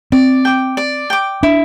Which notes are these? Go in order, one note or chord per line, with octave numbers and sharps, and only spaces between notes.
C4 D5
G5 D6
D5
G5 D6
D4 E4